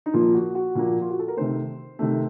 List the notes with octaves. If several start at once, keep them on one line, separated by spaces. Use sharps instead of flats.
D#4
A#2 F3 A#3 F4
F#4
F#4
A#2 F3 A#3
F4
F#4
A4
A#4
C3 D#3 A3 C5
C3 D#3 A3